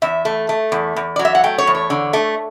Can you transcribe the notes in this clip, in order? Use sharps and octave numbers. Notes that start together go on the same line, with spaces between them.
E2 E5
A3
A3
E2
E2
F#3 D5
E5
F#5
A3 G5
C#5
E2
C#5
D3
A3